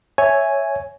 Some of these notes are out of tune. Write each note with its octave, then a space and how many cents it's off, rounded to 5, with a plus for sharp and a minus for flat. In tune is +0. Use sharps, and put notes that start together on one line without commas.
C#5 +0 E5 +0 G#5 +0